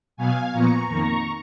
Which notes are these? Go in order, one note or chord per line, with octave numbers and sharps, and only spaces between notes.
B2 F#3 B3 F5 G#5
A#2 F3 B3 A#5 C#6
F2 D#3 A#3 A#5 C#6